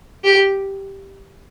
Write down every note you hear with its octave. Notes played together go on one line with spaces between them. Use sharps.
G4